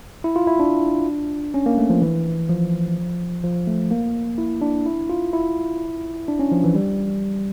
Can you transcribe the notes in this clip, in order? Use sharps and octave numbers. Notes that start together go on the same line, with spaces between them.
E4
F4
E4
D4
C#4
A#3
A3
F3
E3
F3
F3
A3
A#3
E4
D4
E4
F4
E4
D4
C#4
F3
E3
G3